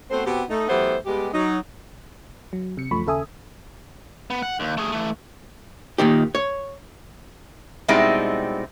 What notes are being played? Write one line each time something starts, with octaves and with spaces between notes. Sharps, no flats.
A3 B3 C4 F#4 C5
B2 B3 C4 G4
A3 D#4
E3 F#3 A3 B3 G4 C5
G3 G#3 B3 G4
F#3 D#4
F#3
C3 C#7
C#2 F#2 F3 A3 B5 C#6
D#2 C#3 A4 E5 G#5 D#6
B3
F#5
D#2
A3 G#4
E3 A3
D#2 A#2 D#3 G4
C#5
B2 G3 G#3 C4 D#4 E4